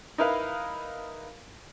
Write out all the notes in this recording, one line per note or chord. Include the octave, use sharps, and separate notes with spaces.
D#4 E4 A#4 B4 F5